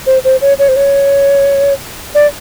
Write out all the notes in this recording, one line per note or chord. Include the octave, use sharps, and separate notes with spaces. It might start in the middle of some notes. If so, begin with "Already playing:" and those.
C5
C5
C#5
C#5
C5
C#5
D5